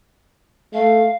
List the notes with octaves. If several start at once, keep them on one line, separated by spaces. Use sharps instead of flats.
A3 F5